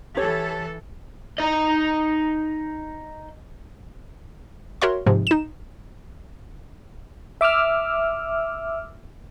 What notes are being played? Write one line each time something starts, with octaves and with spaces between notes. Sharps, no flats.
E3 G4 A4 C#5
D#4 D#5
F#4 A#4 C#5 E5 C6
G#2 C3 F3
D#4 E7
E5 D6 E6 F6